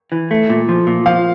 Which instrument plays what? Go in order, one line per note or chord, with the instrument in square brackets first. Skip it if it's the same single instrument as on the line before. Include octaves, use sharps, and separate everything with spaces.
[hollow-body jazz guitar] E3
A3
A#2
F3
A#2
[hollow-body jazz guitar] F3 [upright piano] F5